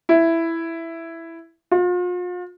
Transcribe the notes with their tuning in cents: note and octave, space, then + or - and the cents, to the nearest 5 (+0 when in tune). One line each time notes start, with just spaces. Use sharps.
E4 +5
F4 +40